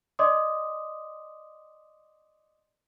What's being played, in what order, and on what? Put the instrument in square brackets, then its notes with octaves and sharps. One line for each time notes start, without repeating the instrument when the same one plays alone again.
[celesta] D5 D#5 C6 D6 D#6